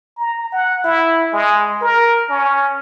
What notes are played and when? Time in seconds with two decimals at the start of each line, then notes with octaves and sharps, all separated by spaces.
0.17 A#5
0.52 F#5
0.84 E4
1.33 G#3
1.81 A#4
2.30 C#4